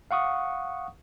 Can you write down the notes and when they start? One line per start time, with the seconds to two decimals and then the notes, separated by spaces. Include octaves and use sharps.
0.11 F5 F#5 C#6 D#6